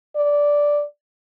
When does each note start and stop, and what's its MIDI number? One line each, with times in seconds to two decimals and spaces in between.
0.16 0.84 74